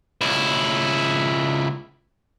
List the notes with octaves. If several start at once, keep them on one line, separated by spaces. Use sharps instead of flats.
C#2 E4